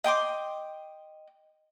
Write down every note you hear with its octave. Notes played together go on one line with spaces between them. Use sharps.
D#5 G5 C6 D6